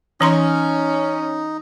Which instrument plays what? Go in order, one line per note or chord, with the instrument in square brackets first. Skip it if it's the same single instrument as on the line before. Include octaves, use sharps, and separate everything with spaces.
[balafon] E3 A#5 C6 [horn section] C#4 [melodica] D#4